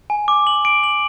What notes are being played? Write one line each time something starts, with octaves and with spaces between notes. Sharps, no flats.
G#5
D6
F#7
D7
F#7